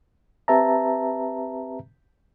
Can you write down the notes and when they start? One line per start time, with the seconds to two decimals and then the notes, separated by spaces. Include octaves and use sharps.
0.48 C4 G4 B4 E5 A5 A#5